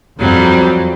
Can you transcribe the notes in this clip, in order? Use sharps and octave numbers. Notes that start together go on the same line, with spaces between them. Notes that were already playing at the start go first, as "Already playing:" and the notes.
F2 F#3 G3